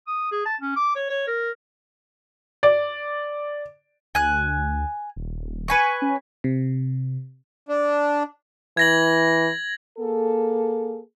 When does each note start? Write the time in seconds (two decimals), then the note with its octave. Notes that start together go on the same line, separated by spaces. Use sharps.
0.07 D#6
0.31 G#4
0.45 A5
0.61 C#4
0.76 D6
0.95 C#5
1.10 C#5
1.27 A#4
2.63 D5
4.15 D2 G#5 F#6
5.16 D#1
5.68 B4 G#5 C#6
6.02 C#4
6.44 C3
7.68 D4
8.77 E3 G#6 A#6 F#7
9.98 A#3 G#4 A4